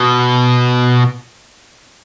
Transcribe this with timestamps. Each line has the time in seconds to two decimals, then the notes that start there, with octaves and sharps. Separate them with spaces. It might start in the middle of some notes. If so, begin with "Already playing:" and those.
Already playing: B2